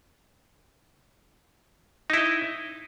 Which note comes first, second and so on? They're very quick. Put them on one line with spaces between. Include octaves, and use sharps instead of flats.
D#4 E4 D#5